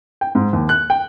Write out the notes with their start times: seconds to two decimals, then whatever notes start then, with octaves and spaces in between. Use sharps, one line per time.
0.21 G5
0.35 G#2
0.53 D#2
0.69 F#6
0.90 G5